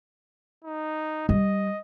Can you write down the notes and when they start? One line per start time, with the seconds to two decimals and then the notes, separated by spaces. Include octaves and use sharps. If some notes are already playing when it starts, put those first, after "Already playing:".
0.64 D#4
1.29 G3 D#5